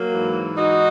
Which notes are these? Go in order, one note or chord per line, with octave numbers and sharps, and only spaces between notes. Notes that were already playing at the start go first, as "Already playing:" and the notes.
Already playing: F#3 A#3
G#2 E3
D#4 F#4